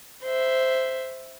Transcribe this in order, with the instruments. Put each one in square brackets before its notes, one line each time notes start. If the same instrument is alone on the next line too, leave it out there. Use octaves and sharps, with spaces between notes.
[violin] C5 E5